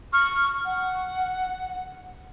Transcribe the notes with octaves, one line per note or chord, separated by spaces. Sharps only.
C#6 F6
F#5